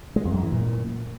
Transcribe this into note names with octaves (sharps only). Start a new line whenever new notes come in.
G#3
F2
F#2
E3
A#2